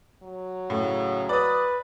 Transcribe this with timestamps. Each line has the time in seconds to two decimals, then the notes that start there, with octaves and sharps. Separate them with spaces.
0.23 F#3
0.70 A2 C#3
1.29 B4 D5 D#6